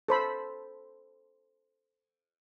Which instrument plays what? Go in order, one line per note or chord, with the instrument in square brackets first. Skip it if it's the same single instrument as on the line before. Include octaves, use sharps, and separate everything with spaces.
[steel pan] A4 C5 B5